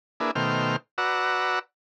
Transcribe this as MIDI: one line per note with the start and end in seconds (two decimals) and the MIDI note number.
0.20 0.31 58
0.20 0.31 62
0.20 0.31 64
0.20 0.31 68
0.20 0.31 71
0.35 0.76 47
0.35 0.76 51
0.35 0.76 57
0.35 0.76 72
0.35 0.76 79
0.35 0.76 89
0.98 1.59 66
0.98 1.59 71
0.98 1.59 74
0.98 1.59 78
0.98 1.59 82
0.98 1.59 88